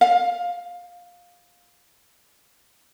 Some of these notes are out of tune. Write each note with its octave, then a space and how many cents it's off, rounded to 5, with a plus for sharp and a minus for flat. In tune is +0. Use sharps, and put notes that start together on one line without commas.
F5 +15